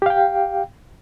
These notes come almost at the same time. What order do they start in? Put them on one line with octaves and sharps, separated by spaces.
G4 F5 G5